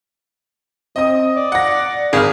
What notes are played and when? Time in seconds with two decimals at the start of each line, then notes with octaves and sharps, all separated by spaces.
0.96 C4 D#5 D#6
1.36 D5
1.52 F#5 A#6
2.13 G#1 G#4 F6